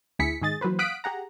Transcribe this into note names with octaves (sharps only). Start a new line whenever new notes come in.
D2 E4 G#4 B6 C#7
G#2 D#3 G#4 D#5 A6
E3 F#3 A#3 B4 C5
F5 F#5 D#6 F#6 B6 D7
G4 G#4 F#5 A#5